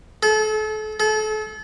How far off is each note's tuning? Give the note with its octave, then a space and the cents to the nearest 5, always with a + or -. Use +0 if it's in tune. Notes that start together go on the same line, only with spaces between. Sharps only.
A4 -35
A4 -35